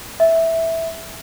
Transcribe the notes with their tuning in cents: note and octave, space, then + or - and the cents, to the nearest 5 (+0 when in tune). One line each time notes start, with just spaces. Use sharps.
E5 -5